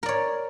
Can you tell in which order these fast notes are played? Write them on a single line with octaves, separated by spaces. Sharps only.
A#4 D5 C#5